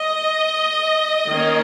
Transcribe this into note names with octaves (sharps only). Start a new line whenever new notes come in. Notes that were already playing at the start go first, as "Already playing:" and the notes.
Already playing: D#5
D#3 A#3 C#4